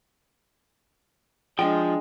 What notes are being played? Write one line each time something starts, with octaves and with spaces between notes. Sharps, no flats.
F3 G#3 D4 D#5 G5